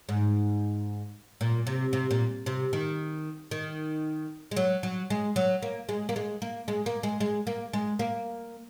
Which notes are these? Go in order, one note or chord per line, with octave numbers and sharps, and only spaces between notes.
G#2
A#2
C3
C3
A#2
C3
D#3
D#3
G#3
F#3
F#3
G#3
F#3
A#3
G#3
A#3
G#3
A#3
G#3
A#3
G#3
G#3
A#3
G#3
A#3